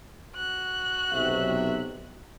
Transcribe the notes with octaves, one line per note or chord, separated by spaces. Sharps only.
F#4 F#6
B1 C3 E5